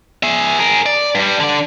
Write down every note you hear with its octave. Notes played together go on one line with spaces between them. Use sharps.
G#4 E5
G#4 A#4
D5
G2 G3
D3 D5